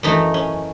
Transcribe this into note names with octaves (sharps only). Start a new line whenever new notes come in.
F#2 E3 A3 D#4
C#4